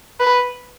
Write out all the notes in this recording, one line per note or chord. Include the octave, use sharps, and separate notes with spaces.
B4